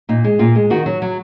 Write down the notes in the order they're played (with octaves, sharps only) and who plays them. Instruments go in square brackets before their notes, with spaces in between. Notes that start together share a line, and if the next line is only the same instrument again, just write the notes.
[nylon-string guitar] A#2 D#4
G#3
A#2 F4
G#3
D#3 F#4
F#3
F#3